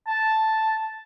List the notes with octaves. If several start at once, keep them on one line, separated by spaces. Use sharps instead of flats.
A5